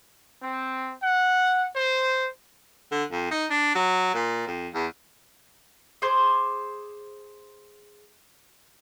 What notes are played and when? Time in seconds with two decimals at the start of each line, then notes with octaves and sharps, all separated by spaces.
0.42 C4
1.03 F#5
1.74 C5
2.91 D3
3.11 F2
3.31 D#4
3.50 D4
3.75 F#3
4.14 A#2
4.48 F2
4.74 E2
6.02 G#4 C5 C6 D6